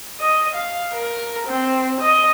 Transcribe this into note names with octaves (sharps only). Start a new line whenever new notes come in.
D#5
F5
A#4
C4
D#5